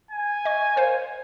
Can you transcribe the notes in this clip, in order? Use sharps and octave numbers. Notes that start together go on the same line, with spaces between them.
G#5
D#5 C#6
A#4 C5 F5